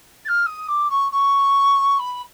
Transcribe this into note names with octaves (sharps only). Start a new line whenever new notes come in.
A6
F6
D#6
D6
C#6
C#6
B5